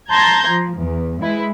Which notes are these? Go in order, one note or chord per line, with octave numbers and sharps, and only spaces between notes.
A5 A#5 C6 G6 G#6 A#6
F3
E2
G#3 E4 B4